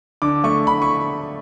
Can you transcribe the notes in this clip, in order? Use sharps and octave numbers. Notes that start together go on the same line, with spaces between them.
D3 D6
A3 C#6
D3 B5
C#6